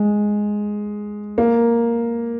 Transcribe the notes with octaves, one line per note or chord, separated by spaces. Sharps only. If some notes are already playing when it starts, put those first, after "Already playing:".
Already playing: G#3
A#3